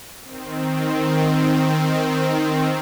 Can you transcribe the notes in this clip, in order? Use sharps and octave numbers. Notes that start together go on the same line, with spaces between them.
D#3 C4